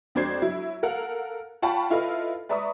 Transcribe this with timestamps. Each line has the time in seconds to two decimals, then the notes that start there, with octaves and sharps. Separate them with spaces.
0.15 F2 D4 F#4 C5 G#6 C7
0.42 F#3 E4
0.83 A4 A#4 F5 F#5
1.62 F4 F#5 G5 A5 B5 C#6
1.90 E4 F4 A4 B4 D#5
2.49 B4 D5 E5 A#5 C#6 D#6